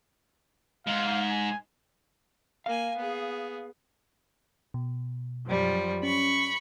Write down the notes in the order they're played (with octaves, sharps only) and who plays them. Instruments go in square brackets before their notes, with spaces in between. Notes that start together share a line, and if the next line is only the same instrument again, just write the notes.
[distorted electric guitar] G#2 [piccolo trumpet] F5
[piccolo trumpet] G#5
[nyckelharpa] A#3 G#5 [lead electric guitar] F5
[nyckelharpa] B3 G#4
[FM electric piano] B2
[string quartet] F#2 F3 G3
[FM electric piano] C#4 [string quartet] B5 C#6